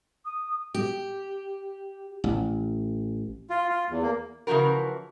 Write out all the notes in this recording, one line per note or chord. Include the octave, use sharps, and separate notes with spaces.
D#6
G4
A1
F4
F4
E2
A#3
C#3 E3 F3 F#4 A#4